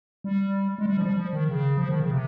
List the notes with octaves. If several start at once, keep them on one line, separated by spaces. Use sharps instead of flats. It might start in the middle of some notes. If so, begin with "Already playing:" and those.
G3
G#3
G3
F3
G3
F3
D#3
C#3
F3
D#3
C#3
C3